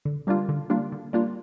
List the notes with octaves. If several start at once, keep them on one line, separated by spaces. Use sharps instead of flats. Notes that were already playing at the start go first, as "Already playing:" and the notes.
D3
G3 A#3 D4 F4
D3
G3 A#3 D4 F4
D3
G3 A#3 D4 F4